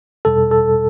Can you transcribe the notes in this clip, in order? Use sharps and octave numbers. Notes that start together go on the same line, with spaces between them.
E2 B2 G3 A4
A4